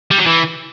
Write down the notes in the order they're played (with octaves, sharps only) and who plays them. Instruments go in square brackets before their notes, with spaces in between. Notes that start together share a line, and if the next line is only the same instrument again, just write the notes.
[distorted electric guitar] G3
F#3
E3